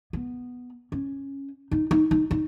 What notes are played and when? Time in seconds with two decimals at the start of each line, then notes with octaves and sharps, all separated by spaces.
0.13 B3
0.92 C#4
1.71 D#4
1.91 D#4
2.11 D#4
2.31 D#4